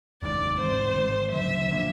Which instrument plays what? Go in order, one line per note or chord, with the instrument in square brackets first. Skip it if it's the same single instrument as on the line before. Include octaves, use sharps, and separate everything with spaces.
[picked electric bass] F1 D#2 D#3 G#3 [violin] D5
[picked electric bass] G#2 E3 G#3 C4 [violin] C5
[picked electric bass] G#2 D#3 G#3
[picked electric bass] D2 C#3 F#3 [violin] E5
[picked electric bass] F3 A#3 D4